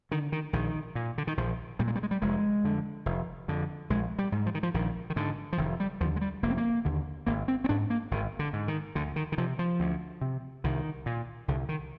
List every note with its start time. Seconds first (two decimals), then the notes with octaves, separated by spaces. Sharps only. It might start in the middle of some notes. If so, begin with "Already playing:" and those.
0.11 D3 D#3
0.32 D#3
0.53 A#1 D#3
0.95 A#2
1.18 D3
1.27 D#3
1.37 A#1 F3
1.79 A#2 G3
1.87 G#3
1.95 G3
2.03 G#3
2.11 G3
2.22 F1 G#3
2.64 F2 D3
3.06 F1
3.48 F2 D3
3.90 A#1 G#3
4.19 G3
4.32 G#2
4.46 F3
4.55 D#3
4.63 F3
4.74 A#1 D#3
5.10 D#3
5.16 G#2 D3
5.53 F3
5.58 F1 D#3
5.80 G3
6.01 D#2 F3
6.04 D3
6.16 G#3
6.21 G3
6.43 F1 A#3
6.50 C4
6.57 A#3
6.85 D#2 D3
7.27 G#1 A#3
7.48 C4
7.64 C4
7.69 G#2 D4
7.90 A#3
8.11 G#1 D#3
8.39 D3
8.53 G#2
8.68 D#3
8.95 D2 D3
9.16 D#3
9.32 D#3
9.38 C3 F3
9.59 F3
9.80 D2
10.21 C3
10.64 C2 D#3
11.06 A#2
11.48 C2 D3
11.69 D#3